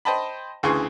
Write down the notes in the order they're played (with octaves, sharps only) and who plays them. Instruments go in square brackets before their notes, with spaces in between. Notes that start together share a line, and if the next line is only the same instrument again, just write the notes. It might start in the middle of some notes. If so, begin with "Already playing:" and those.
[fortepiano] C5 D#5 G5 A5 B5
D2 C#3 E3 G#4 C6 C#6